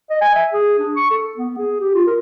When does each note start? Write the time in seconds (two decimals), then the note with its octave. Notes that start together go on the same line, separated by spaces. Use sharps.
0.10 D#5
0.21 G#5
0.35 E5
0.53 G#4
0.79 D4
0.96 C#6
1.11 A4
1.37 B3
1.58 G#4
1.80 G4
1.94 F4
2.07 A#4